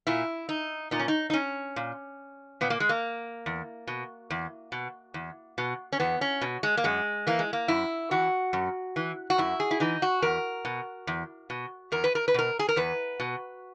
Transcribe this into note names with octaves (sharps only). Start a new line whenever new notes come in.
A#2 E4
D#4
A#2 D#4
C#4
D#4
D#4
C#4
A#2
A#2 B3
A#3
G#3
A#3
E2
B2
E2
B2
E2
B2
C#4
E2 B3
C#4
B2
G#3
A#3
F#2 G#3
E3 A#3
G#3
A#3
F#2 E4
E3 F#4
F#2
E3
F#4
F#2 E4
G#4
E4
E3 D#4
F#4
E2 A#4
B2
E2
B2
E2 A#4
B4
A#4
B4
B2 A#4
G#4
A#4
E2 B4
B2